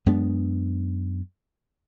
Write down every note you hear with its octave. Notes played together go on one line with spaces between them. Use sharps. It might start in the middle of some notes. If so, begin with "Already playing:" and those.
F#2 G#3 B3 D4